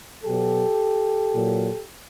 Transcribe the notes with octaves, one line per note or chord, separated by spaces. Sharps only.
B2 F#3 G4 A4
A#2 F#3